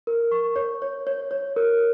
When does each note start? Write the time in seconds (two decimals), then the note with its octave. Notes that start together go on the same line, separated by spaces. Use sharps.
0.07 A#4
0.32 C#6
0.56 C#5
0.82 C#5
1.07 C#5
1.31 C#5
1.56 A#4